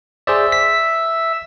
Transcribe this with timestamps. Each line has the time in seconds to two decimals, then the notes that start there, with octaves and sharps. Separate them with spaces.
0.27 G#4 C5 D5 E5
0.52 B6